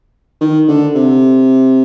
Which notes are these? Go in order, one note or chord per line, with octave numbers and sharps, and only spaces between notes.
D#3
D3
C3